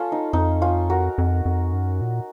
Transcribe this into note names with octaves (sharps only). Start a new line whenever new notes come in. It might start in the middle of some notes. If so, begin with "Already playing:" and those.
Already playing: C#4 F4 A4
D#4
F2 D#4
C#4 F4
F#4 A#4
F2
F2
F#2
A#2